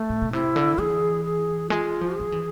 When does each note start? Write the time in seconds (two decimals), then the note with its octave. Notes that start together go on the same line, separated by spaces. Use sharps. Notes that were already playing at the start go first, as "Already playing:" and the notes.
Already playing: A3
0.10 A2
0.22 B2
0.33 C3 E4
0.56 D3
0.78 E3 G#4
1.25 G#4
1.70 G#3 F4
2.01 F3
2.16 F3 G#4
2.32 E3